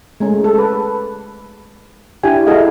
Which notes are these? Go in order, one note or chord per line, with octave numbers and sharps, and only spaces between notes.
G#3 A3 C#4
A4
B4
D4 E4 G4 G#5
E4 F#4 G#4 A4 D#5 F5